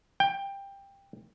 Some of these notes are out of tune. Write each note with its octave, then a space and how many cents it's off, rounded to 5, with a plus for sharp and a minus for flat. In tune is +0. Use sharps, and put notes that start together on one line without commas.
G5 +15